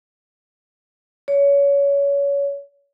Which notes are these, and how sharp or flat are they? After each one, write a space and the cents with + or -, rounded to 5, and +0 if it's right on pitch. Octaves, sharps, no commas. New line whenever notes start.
C#5 +25